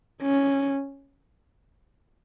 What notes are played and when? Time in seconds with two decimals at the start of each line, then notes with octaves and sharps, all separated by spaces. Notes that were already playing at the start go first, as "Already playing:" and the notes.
0.22 C#4